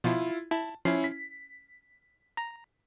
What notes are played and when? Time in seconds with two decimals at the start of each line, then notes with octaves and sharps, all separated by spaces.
0.04 B2 F3 E4 F4
0.51 E4 A5
0.85 F3 C#4 E4 C7
1.04 B6
2.37 A#5